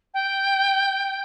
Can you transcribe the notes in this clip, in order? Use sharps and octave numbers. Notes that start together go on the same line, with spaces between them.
G5